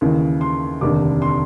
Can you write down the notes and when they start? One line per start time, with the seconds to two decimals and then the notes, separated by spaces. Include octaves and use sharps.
0.01 D#2 C#3 E3
0.41 C6
0.81 F1 D#2 D3 D6
1.22 C6